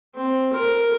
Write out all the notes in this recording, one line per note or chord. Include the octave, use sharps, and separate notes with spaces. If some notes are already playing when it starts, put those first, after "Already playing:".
C4
A#4